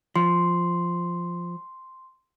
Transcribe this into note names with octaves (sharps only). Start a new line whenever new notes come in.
F3 C6